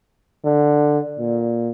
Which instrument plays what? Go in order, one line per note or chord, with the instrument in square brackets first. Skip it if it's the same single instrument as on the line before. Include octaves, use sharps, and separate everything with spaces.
[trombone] D3
A#2